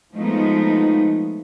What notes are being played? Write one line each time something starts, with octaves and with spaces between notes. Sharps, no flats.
F3 G#3 A3 B3 D#4